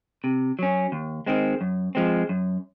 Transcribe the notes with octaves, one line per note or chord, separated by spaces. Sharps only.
C3
F#3 C#4
D#2
D#3 G#3 C4
F#2
F3 G#3 C4
F#2